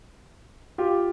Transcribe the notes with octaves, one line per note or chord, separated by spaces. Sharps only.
F4 G4